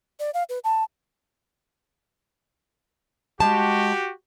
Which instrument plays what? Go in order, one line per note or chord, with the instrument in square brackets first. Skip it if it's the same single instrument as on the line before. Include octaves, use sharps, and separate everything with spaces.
[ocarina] D5
F5
B4
A5
[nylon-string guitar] G#3 A5 [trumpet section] F#4 G4